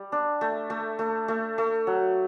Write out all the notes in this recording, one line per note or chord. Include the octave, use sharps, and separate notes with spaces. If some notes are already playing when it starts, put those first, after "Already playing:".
Already playing: G3
D4
A3
A3
A3
A3
A3
F#3